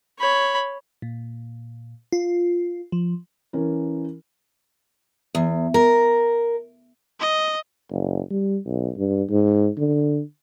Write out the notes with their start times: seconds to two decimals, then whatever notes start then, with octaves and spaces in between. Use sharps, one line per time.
0.19 C#5 B5
1.02 A#2
2.12 F4
2.92 F3
3.53 E3 C#4 A#4
5.35 E2
5.74 A#4
7.21 D#5
7.91 F#1
8.30 G3
8.66 B1
8.97 G2
9.30 G#2
9.78 D3